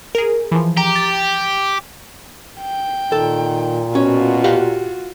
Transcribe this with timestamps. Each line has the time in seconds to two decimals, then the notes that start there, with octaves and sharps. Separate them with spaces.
0.15 G#4 A#4
0.52 E3 F3
0.77 G4 A#5
0.96 A6
2.61 G5
3.12 A#2 D#3 A4
3.95 B2 C#4 F4 F#4
4.44 G4 F5 F#5